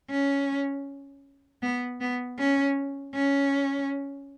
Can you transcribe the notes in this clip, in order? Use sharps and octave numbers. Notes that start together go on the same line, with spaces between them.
C#4
B3
B3
C#4
C#4